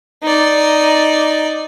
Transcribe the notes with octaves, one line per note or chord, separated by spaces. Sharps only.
D#4 D5